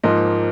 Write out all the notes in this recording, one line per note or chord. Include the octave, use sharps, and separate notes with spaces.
G#2 F3 A#3 D#5